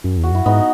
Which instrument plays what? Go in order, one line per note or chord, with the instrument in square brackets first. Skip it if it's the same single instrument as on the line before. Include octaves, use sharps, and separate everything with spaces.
[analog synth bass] F#2
E2
[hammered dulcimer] F#4
[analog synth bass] F#2 [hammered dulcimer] E4
[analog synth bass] G#2 [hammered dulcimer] B3 D#4